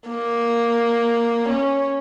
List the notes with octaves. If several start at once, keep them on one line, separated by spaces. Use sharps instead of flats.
A#3
C#4